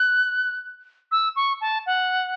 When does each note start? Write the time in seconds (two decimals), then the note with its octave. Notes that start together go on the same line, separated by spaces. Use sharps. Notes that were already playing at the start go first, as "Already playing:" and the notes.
Already playing: F#6
1.12 E6
1.36 C#6
1.61 A5
1.86 F#5